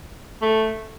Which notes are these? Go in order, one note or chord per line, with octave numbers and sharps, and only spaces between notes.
A3